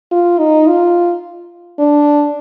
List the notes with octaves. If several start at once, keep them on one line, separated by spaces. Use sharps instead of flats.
F4
D#4
F4
D4